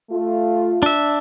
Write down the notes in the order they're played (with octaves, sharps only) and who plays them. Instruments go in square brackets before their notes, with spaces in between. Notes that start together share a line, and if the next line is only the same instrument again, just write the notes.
[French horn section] A3 F4
[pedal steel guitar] D4 E5